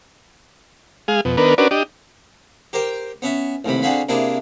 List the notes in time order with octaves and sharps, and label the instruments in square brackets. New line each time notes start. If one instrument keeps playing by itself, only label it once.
[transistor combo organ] G#3 G#4 F5
F2 B2
D#3 B3 D4 A#4 B4
C#4 D4 F#4 A#4 B4 D5
D4 G4 D#5
[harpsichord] G4 A#4 C5 G5
B3 C#4 E5
A1 D#2 C3 B5
D3 C4 F#4 G#4 F5 B5
C3 A#3 D4 E4 F4 G#4